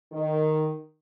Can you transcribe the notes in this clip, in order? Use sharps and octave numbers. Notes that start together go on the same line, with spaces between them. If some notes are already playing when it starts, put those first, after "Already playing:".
D#3